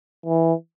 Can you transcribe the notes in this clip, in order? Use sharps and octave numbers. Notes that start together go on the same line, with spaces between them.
E3